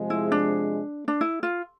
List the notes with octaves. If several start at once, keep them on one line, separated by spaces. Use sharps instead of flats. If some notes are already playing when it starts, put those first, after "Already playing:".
Already playing: C3 F3 G#3
E4
D4
D4
E4
F4